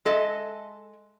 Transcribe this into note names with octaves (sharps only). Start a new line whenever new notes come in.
G#3 A4 D#5 E5